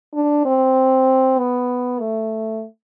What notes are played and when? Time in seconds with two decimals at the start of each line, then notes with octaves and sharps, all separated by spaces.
0.14 D4
0.45 C4
1.38 B3
2.00 A3